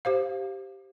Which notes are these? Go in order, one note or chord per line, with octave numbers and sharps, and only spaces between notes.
G4 C5 F5